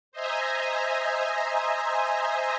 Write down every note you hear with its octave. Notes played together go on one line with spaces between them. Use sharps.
C5 D#5 E5 G#5 A#5